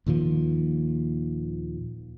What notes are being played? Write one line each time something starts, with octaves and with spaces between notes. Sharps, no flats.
D#2 A#2 D#3 F3